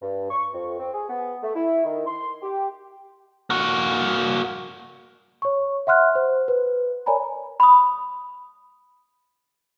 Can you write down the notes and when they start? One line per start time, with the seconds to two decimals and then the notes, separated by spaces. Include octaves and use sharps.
0.02 G2
0.31 C#6
0.53 F2
0.79 C4
0.94 G#4
1.09 B3
1.42 A3
1.55 E4
1.85 D#3
2.06 C6
2.42 G4
3.50 A#3 F#4
5.42 C#5 C#6
5.87 E5 F#5 C6 F6 F#6
6.15 C5
6.48 B4
7.06 A#4 C#5 D5 G#5 A#5 B5
7.60 B5 D#6